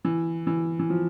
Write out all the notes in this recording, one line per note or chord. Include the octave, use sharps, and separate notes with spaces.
E3
E3
E3
F3